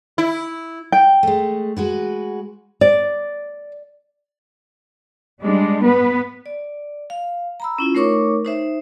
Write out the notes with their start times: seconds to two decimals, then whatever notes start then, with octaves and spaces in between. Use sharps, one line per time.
0.18 E4
0.92 G5
1.23 G#3 A3
1.77 G#3 F#4 B4
2.81 D5
5.43 G3 G#3 D4
5.84 B3 B4
6.46 D5
7.10 F5
7.60 A#5 B5 E6
7.78 C#4 E4 F4
7.95 A3 D#4 A#4 C#5 C#6 D6
8.45 D#4 C5 E5